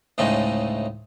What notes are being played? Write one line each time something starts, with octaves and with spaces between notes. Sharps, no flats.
D2 A2 C#3 G#3 A3 D#4